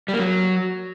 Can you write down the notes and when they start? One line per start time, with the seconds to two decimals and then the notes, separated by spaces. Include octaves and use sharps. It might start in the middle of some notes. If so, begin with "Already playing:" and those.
0.08 G3
0.14 A#3
0.19 F#3